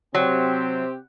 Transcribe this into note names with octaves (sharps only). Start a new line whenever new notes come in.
C3 F#3 C4 G4